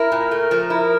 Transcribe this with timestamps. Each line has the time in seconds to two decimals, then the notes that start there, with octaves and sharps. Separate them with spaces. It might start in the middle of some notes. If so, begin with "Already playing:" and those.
Already playing: E4 A#4
0.12 A#2
0.31 A3
0.51 F3
0.70 E4